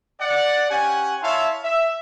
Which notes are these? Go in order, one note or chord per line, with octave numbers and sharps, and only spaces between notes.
D5 F#5
C#4 G4 F#5 G#5
E4 C#5 E5 F5 A5 C6
E5